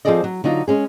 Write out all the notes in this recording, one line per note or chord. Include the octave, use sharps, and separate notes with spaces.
F3 C4 G#4 A4 D5 D#5
F#3
D3 F#3 D#4 F4
G#3 C#4 G#4